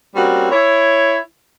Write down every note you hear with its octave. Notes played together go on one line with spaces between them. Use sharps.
G3 A#3 C4 C#4 F#4
E4 C#5